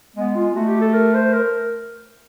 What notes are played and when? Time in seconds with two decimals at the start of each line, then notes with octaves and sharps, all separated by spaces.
0.16 G#3 B3
0.35 F4
0.55 A3 F#4
0.68 G4
0.81 A4
0.94 A#4
1.14 C5
1.33 A#4